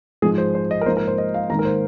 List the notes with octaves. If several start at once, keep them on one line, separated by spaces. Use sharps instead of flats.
G#2 F3 G#3 G#4
C5
C5
D#5
A#4
G#2 F3 A#3 C5
A#4
C5
D#5
F5
G#2 D#3 A#3 A#5
A#4
C5